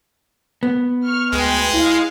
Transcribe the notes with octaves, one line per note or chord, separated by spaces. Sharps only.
B3
C#6 F6
D2 G#3 B4 G5
E4 F5